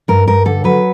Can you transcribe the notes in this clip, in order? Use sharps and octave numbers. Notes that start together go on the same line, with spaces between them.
G2 A#4
G2 A#4
D3 A4
F#3 B4